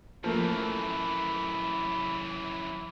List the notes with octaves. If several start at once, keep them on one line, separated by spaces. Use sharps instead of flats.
F#2 E3 F3 A3 A#3 B5